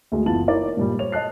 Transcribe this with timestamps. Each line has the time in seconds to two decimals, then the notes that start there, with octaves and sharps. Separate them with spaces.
0.12 D2 G#3
0.26 F#1 E3 B3 F4 A5 F#7
0.48 D#4 E4 A#4 C#5 D5
0.77 G2 A#2 G3
0.99 C5 C#5 F7
1.12 D#5 A5 F#6 C7